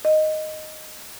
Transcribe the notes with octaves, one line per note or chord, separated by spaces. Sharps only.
D#5